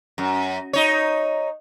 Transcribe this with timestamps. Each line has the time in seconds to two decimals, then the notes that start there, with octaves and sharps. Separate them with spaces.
0.18 F#2
0.73 D#4 C#5